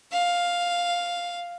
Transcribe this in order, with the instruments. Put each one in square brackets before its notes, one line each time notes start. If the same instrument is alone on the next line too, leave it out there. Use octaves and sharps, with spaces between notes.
[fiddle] F5